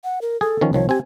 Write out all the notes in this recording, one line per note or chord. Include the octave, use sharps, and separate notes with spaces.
F#5
A#4
G#4 A4
D#3 F3 C#4
C2 D#3 F3 C#5
C4 G4 G#5